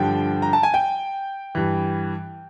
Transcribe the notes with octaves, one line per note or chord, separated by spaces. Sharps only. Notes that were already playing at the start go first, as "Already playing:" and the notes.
Already playing: G2 D3 F3 G5
A#5
A5
G#5
G5
G2 E3